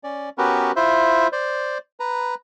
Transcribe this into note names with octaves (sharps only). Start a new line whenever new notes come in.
C#4 D5
B3 C#4 F#4 G4 A#4 B4
E4 F4 C5 E5
C5 D5
B4 A#5